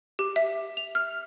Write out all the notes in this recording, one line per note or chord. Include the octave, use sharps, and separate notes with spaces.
G4
E5
F7
F6